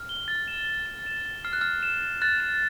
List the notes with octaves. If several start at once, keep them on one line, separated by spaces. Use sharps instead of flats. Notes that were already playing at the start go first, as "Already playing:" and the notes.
Already playing: F6
G7
A6
E7
G7
E7
E7
A6
F6 C7
F#6
F6 C7
E7
E7
F#6 A6
E7